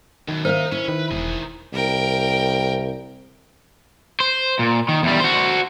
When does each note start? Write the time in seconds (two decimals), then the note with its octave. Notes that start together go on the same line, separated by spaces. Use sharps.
0.28 F#2 B2 D#3
0.45 D#4 A#4 C5 E5 F5
0.72 C#4 E4
0.88 D#3 B4
1.11 E1 D#3 G#4
1.73 C2 A#4 G5
4.20 C5
4.59 A#2
4.89 D#3
5.03 E2 G3
5.20 F#4 C5